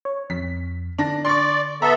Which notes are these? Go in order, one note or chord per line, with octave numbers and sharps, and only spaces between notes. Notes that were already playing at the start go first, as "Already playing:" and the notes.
C#5
F2 B6
D3 D4 A#6
D5 C6 C#6
B3 A4 E5 A#5